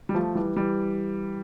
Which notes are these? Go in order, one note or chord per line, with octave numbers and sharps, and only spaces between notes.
G3
F3 A3
E3 G3
E3 G3